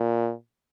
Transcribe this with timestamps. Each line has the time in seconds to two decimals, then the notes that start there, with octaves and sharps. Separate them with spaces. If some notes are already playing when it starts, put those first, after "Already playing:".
Already playing: A#2